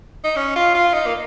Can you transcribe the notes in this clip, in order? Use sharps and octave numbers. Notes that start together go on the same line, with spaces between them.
D#4
C#4
F4
F4
D#4
A#3